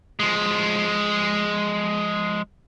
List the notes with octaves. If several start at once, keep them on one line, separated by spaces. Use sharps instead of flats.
F3 G#3